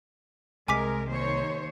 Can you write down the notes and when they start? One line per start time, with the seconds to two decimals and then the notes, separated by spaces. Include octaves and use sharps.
0.68 C2 G#3 A#4 G#5 D6 B6
1.08 D#2 C5 C#5